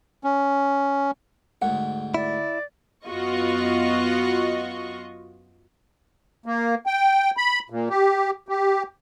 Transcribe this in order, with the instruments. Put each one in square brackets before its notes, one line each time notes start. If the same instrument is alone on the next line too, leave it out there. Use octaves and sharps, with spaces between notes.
[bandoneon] C#4
[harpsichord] D2 G#2 [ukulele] F#5
[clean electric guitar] E4 [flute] D5
[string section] F#2 B3 F4 F#4 D#5 C#6
[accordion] A#3
G5
B5
A#2
G4
G4